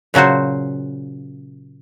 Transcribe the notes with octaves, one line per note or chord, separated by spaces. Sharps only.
A#2 C#3 F#3 F#4 C5